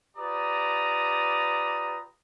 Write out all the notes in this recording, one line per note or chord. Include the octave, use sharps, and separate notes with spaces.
F4 G4 B4 D5 A#5 D#6